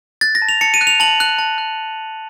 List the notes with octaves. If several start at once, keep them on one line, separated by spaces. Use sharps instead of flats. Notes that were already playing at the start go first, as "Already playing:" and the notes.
F#6 A6
A#6
A5
F7
A5 C#7
D#7
F#6
F7
A5 F#7
F#6
A5
F#6